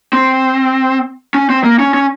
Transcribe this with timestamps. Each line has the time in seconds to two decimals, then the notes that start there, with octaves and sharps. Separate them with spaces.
0.13 C4
1.34 C#4
1.50 C4
1.64 A#3
1.79 C#4
1.94 C#4